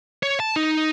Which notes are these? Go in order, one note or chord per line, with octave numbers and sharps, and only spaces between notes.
C#5
A5
D#4